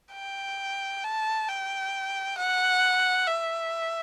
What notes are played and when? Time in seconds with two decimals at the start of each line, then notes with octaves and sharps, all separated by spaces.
0.14 G5
1.04 A5
1.48 G5
2.38 F#5
3.27 E5